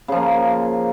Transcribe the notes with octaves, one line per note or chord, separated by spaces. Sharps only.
C#3 F3 A#3